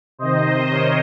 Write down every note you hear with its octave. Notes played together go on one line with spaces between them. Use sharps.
C3 D#3 C5 D#5
A#4 C#5